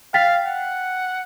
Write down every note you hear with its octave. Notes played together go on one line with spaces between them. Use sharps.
F5 G5 A6 B6
F#5